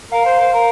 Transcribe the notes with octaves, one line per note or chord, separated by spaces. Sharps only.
A#4 F5
C5
C5
A#4